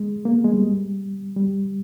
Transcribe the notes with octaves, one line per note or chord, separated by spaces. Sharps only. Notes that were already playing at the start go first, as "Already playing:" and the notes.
Already playing: G#3
A#3
B3
G#3
G3
G3